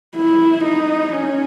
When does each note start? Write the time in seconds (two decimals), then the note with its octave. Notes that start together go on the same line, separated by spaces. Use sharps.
0.16 E4
0.64 D#4
1.13 C#4